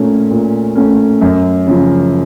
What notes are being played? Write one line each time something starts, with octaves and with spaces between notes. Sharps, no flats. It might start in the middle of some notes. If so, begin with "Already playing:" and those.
Already playing: A#2 A3 C#4
A#2
A3 C#4
F#2
C#3 F3